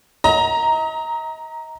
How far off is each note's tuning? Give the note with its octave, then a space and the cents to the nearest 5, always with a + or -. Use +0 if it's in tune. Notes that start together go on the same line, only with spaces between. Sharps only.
D#5 +35 A#5 +0